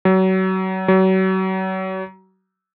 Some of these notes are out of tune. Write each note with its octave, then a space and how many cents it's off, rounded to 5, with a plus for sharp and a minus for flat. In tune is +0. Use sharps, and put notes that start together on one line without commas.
F#3 +30
F#3 +35